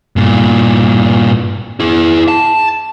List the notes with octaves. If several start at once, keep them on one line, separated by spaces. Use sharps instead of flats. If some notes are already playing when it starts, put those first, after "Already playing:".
G2 A#2
E4 G#4
A5